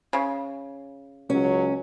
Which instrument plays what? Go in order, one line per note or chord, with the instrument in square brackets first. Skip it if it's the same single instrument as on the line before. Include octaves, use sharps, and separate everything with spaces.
[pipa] C#3
[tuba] C#2 [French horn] F#3 [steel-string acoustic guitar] C#4